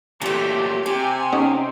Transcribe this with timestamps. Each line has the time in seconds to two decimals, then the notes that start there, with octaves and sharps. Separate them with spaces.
0.22 A#2 E3 F#3 A3 G4 A4
0.86 C3 G4 G#5
1.33 C#4 D#4 F#5